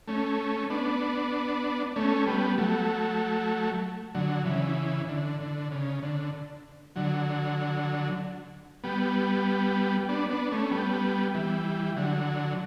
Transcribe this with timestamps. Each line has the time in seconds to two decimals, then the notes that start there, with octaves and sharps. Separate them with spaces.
0.08 A3 C#4
0.70 B3 D4
1.96 A3 C#4
2.26 G3 B3
2.58 F#3 A3
4.15 D3 F#3
4.45 C#3 E3
5.09 D3
5.40 D3
5.72 C#3
6.02 D3
6.96 D3 F#3
8.84 G3 B3
10.09 B3 D4
10.30 B3 D4
10.52 A3 C#4
10.71 G3 B3
11.34 E3 G3
11.97 D3 F#3